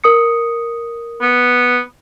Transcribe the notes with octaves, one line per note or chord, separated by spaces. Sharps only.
A#4 D#6 C#7
B3